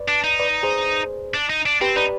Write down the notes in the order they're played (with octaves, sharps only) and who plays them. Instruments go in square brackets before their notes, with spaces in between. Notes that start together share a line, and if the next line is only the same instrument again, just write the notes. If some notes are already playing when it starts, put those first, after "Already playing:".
Already playing: [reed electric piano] B4 D5
[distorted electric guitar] D4
D#4
[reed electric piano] B4 D5
G#4 C5
[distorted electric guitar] D4
D#4
D4
[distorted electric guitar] C4 [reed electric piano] G4 B4
[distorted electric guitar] D#4 [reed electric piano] B4 D5